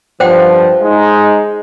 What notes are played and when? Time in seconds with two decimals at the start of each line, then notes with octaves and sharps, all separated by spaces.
0.20 G2 F3 C5 F#5 G5
0.82 G#3 D#4